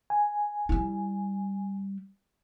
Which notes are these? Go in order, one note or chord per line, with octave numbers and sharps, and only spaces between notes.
G#5
G3 E4